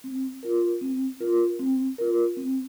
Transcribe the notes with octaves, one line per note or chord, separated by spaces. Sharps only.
C4
F4 A#4
C4
F4 A#4
C4
F4 A#4
C4